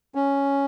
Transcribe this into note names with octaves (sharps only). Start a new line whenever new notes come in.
C#4